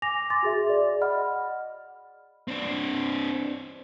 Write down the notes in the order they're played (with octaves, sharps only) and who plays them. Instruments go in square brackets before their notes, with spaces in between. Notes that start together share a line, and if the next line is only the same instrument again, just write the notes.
[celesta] G#5 D6 A#6 F7
C6 D6 A6
F#4 G#4 E5
D5
D#5 F#5 B5 F6
[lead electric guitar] C4 D4